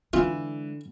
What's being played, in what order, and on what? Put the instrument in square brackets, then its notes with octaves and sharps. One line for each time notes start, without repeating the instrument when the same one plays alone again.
[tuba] D3 [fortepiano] E3 [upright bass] G#3 [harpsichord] F4